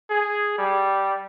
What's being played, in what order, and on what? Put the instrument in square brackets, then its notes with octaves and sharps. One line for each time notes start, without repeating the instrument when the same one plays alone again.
[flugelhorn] G#4
G3